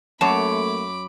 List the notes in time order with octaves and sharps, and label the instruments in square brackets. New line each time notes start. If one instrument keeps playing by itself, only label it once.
[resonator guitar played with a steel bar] F#2 C#5 [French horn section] A3 A#3 [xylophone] A5 [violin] B5 D6